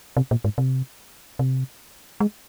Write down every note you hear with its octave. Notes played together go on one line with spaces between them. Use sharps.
C3
A#2
G#2
C3
C3
G#3